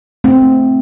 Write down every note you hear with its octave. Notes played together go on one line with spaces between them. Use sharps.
A3 C4